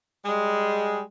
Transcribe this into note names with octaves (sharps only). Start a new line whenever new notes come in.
G3 G#3